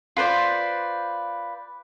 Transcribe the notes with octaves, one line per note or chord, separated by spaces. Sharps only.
F4 B4 C5 D5